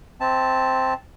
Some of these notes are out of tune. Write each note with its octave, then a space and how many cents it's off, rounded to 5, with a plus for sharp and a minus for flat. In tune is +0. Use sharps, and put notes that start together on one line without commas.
C4 +0 E5 -35 A5 +0